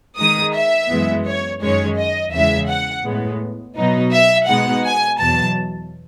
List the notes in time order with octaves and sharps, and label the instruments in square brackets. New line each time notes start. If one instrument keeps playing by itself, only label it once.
[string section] D#3 G#3 D#4 D#6
E5
F#2 E3 G#3 B3
C#5
F#2 D#3 G#3 C#4 C#5
D#5
E2 C#3 E3 G#3 E5
F#5
A2 G#3 B3
B2 F#3 B3 D#4
E5
B2 G#3 B3 D#4 F#5
G#5
E2 B2 F#3 A5